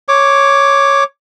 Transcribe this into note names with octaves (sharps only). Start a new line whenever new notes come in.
C#5 D6